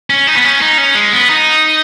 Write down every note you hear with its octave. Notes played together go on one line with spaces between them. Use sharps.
C#4
D#4
B3
C#4
D#4
C#4
G#3
B3
D#4